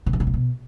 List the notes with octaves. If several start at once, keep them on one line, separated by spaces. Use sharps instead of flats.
B2
G2
C3
A#2
B2